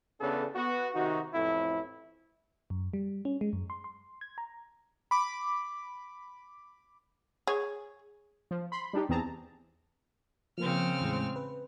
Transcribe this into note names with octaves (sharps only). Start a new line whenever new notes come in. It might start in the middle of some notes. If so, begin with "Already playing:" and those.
E2 C#3 B3 C#4 D4 A4
B3 F#4
C3 D#3 D#4 F#4
A1 F2 A2 C4 E4
F#2
G3
C#4
G#3
F#2
C6
C6
G#6
A#5
B5 D6
G#4 C#5
F3
B5 C6
G3 D4 D#4 G4
E2 E3 C4 G#4 A5 A#5
C#3 F3 A#3 C4 F6
E2 A2 G#3
B4